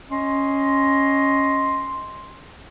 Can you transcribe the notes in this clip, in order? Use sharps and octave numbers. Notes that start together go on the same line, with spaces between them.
C#4 D#5 C6